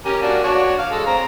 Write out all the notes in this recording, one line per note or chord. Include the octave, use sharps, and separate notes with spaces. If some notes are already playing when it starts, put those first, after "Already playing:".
C#4 G4 A#4
A#3 D4 F#4
D4 F#4 C#5
F5
G#3 A4
C4 A#5